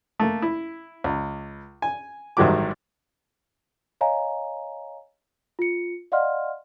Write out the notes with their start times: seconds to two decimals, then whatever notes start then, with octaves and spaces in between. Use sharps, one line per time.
0.20 A3 A#3
0.42 E4
1.04 C#2
1.82 G#5
2.37 A1 G#2 D#3 F#3 G3 D6
4.01 C#5 D#5 F5 G#5 A#5
5.59 F4 C#7
6.12 D5 D#5 F5 F#5 C6 F6